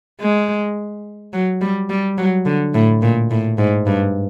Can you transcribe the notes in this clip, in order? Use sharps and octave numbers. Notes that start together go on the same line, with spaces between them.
G#3
F#3
G3
G3
F#3
D3
A2
A#2
A2
G#2
G2